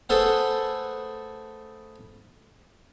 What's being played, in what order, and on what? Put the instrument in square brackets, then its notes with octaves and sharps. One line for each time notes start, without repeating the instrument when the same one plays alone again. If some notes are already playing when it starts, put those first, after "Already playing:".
[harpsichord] A3 G#4 A4 B4 C5 F#5